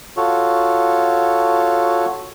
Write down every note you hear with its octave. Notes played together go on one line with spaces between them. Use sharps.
F4 F#4 A4 C#5